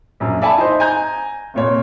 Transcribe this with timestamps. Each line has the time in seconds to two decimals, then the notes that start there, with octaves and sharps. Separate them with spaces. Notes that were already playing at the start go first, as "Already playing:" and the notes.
0.20 A#1 F#2
0.41 A4 D5 E5 G#5 A5 B5
0.58 D#4 C5
0.80 G#5 A#5 G6
1.54 F1 A#2 C#5